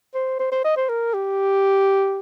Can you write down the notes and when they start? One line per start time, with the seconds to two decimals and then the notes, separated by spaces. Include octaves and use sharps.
0.15 C5
0.39 C5
0.52 C5
0.64 D#5
0.77 C5
0.89 A#4
1.14 G4